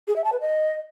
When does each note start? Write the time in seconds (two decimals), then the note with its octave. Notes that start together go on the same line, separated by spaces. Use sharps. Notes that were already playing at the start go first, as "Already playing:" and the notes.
0.08 G#4
0.16 E5
0.24 A5
0.33 B4
0.41 D#5